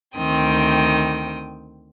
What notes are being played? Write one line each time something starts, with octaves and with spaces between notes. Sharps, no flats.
D2 D#3 C4 G5 D#6